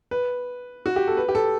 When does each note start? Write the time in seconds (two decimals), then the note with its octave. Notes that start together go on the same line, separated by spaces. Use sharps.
0.11 B4
0.86 F#4
0.96 G4
1.07 A4
1.17 B4
1.29 G4
1.35 A4